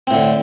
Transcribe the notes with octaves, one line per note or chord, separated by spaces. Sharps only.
A2 D3 C4